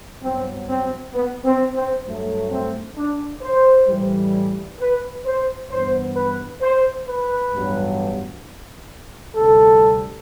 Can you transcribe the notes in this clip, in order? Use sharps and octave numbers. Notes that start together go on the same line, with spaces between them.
G2 F#3 B3 C4
C4
B3
C4
C4
G2 F#3 A3
C4
D4
C5
A2 E3 G3
B4
C5
G2 E3 B3 C5
B4
C5
B4
A1 G2 F#3 B3
D2 C3 G3 A4